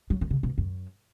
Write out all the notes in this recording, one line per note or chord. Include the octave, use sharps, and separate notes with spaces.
F#3
D#3
C#3
B2
F#2